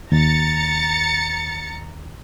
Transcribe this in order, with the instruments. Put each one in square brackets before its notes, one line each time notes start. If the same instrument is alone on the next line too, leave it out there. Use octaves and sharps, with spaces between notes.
[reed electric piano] D#2 [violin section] A#5 A6 C#7